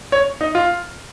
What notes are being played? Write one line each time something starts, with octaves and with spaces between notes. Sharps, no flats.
C#5
D#4
F4